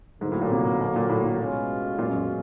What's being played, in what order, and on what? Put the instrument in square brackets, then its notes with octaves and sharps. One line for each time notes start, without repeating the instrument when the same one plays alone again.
[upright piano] G#2 [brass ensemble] D3 F#3 A#3
[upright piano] A2
A#2
C3
B2
A#2
A2
A2
[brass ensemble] B2 G#3 C#4 F4
[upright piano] A#2
F#2